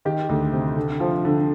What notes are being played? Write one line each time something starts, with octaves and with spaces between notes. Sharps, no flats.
D#3 G4
D2
C3
D3
F3
D3